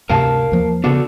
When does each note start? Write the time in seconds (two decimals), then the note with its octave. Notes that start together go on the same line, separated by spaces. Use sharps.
0.09 D2 G2 C3 A#4 F5 A5
0.52 D#2 F3 A#3
0.84 C#3 B3 D4 F#4 A4